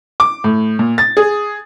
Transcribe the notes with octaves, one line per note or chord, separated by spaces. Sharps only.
D6
A2
A#2
A6
G#4